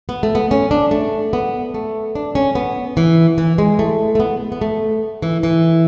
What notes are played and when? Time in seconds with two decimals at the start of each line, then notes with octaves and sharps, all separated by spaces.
0.09 B3
0.23 A3
0.35 B3
0.51 C#4
0.71 D4
0.91 A3
1.33 B3
1.74 A3
2.15 D4
2.35 C#4
2.55 B3
2.97 E3
3.38 E3
3.58 G#3
3.79 A3
4.15 A3
4.20 B3
4.52 B3
4.61 A3
5.22 E3
5.43 E3